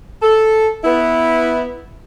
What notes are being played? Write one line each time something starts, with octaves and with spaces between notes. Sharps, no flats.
A4
B3 E4